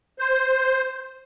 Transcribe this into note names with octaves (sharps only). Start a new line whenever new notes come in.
C5